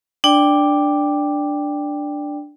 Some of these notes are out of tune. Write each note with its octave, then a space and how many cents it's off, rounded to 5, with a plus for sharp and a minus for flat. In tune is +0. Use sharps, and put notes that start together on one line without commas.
D4 +0 D5 +0 G5 +10